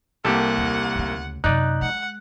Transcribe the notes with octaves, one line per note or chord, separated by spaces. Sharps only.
C2 A#3 G4 A4 F#5
D#2
D2 C#3
F#2 C3 D#4 D5 F#6
G#3 F#5